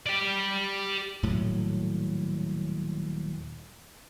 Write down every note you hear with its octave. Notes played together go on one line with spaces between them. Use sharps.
G4 D5
D#1 A2 F#3